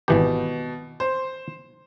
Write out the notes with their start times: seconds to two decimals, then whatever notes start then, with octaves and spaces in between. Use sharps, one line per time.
0.08 G#1 B2 E3 G4
1.00 C5